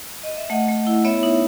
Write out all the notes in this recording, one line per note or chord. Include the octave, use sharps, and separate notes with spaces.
D#5
E5
A3 D#5 F#5
A3
E4
B3 C#5 E5
D#4